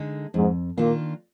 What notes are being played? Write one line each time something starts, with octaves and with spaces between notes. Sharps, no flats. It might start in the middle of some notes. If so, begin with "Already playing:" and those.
Already playing: D3 G#3 D#4
F2 G#2
A#2 D#3 A#3 D4 F4